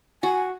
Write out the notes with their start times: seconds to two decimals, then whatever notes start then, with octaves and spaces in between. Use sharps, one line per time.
0.23 F#4 G#5